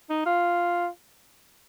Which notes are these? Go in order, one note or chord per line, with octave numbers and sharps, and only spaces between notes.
D#4
F4